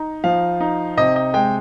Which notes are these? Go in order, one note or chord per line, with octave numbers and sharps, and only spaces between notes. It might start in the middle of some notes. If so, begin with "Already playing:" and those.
Already playing: D#4
F3 F5
D#4
C3 D#5
D#5
G#3 G5